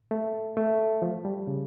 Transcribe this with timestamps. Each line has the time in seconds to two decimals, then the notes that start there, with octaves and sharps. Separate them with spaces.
0.11 A3
0.57 A3
1.02 F3
1.25 G3
1.47 C#3